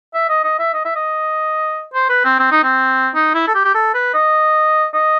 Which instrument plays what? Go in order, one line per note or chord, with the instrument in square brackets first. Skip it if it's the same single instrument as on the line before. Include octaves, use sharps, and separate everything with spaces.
[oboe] E5
D#5
D#5
E5
D#5
E5
D#5
C5
B4
C4
C4
D#4
C4
D#4
E4
A4
G4
G4
A4
B4
D#5
D#5